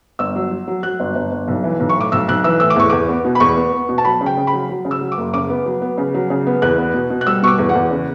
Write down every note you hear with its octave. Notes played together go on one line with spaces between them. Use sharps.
G1 E6
F#3
F#3
F#3
F#3 F#6
G1
G1
G1
B1
E3
B1
C#6
A2 D6
B1 E6
B1 F#6
E3 E6
A2 E6
D6
E2 C#6
E2 D6
B3
B2
B5
E2 C#6
B3
B3
B2
A5
F#3 B5
C#3
G5
C#3
B5
F#3
F#3
C#3
E6
F#3
D6
F#1
C#3 D6
B3
F#3
B3
C#3
F#3
C#3
B3
E2 F#6
B3
B2
B2
F#6
G3 E6
B2 C#6
D6
E2
F#5
E2
C#3